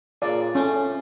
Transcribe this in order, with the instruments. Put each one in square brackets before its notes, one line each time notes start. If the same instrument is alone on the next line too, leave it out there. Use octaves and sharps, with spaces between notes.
[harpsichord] A#2 C#3 [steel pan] D5
[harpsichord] A2 A3 [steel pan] C#4